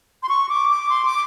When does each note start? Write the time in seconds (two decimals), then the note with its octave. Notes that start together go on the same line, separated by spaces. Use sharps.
0.23 C6
0.29 C#6
0.49 D6
0.69 D6
0.90 C6
1.05 D6